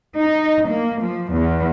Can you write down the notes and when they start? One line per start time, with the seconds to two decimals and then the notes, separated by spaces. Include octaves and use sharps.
0.18 D#4
0.69 A#3
1.01 F3
1.34 E2